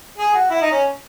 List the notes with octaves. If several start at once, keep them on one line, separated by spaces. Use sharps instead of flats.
G#4
F#4
E4
D#4
C#4